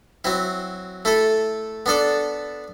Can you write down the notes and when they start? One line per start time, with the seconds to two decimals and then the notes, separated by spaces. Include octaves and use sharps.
0.24 F#3 C4 E4
1.05 A3 E4 A4
1.86 B3 D4 A4 D5